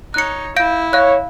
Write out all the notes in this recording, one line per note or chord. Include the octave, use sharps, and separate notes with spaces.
D#4 C#5 F#6 C#7
E4 F5 G6 D7
C#5 F5 F#6